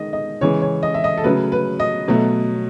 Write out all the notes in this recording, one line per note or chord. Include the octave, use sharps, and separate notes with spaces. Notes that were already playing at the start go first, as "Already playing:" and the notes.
Already playing: D#3 G#3 D#5
D#5
C#3 E3 G#3 C#5
C#5
D#5
E5
D#5
A4
C#3 F#3 A3 B4
B4
D#5
B2 F#3 A3